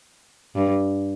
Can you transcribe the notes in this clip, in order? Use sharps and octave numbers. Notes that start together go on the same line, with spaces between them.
G2